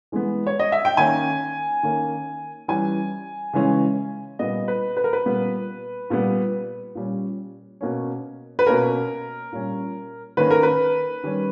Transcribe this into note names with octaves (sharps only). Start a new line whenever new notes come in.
E3 G#3 B3
C#5
D#5
E5
G5
D#3 A#3 C#4 G#5
D#3 A#3 C#4
E3 G3 C#4 G#5
C#3 E3 G#3 C#4
A#2 G3 B3 D#5
B4
B4
A#4
B4
A#2 G3 B3
A#2 G3 B3
A#2 G3 C#4
B2 A#3 C#4
B4
B2 A#3 C#4 A#4
A#2 G3 C#4
D#3 A#3 C#4 B4
A#4
B4
D#3 G3 C#4